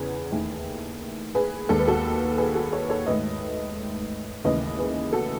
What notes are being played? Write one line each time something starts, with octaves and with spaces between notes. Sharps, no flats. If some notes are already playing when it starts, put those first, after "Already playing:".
Already playing: E2 C#3 G#4 B4
D#2 D#3 A3
G#4 B4
D#2 D#3 G#3 A4
B4
F#4 A4
G#4 B4
F#4 A4
A4 C#5
A4 C#5
G#2 D#3 A3 B4 D#5
D#2 C#3 E3 A3 B4 D#5
G#4 B4
F#4 A4